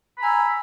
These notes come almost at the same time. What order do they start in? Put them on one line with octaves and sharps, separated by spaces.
B5 A#5 G#5 E6